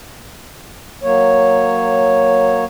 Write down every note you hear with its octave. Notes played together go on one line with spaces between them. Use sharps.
F#3 A#3 C#5